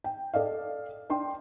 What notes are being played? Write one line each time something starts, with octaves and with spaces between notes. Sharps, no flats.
G5
A4 D5 D#5 F5
D4 G5 C6